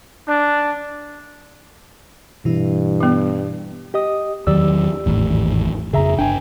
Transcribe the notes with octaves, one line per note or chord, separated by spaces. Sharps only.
D4
G2 B2 E3 E4
G3 B3
G4 D#5 D#6
E2 D#3 F#3 G4 D5 E6
G#1 E2 A2
F2 C#3 G#4 E5 A#5
G1 D4 G5 G#5